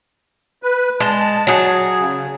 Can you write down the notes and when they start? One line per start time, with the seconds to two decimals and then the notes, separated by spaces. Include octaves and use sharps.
0.63 B4
1.00 G#3 A5
1.47 F#3 G#4
2.00 C#3